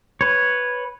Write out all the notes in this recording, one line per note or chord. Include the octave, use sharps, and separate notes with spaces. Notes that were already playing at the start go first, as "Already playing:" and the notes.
B4 C#5